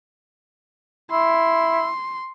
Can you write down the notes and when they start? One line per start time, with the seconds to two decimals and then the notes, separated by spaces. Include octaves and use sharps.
1.11 E4 C6